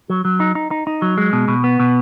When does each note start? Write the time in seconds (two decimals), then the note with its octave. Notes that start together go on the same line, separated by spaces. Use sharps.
0.10 F#3
0.25 F#3
0.40 D#4
0.55 D#4
0.71 D#4
0.87 D#4
1.02 F#3
1.18 G#3
1.33 B2
1.48 B2
1.64 B3
1.80 B2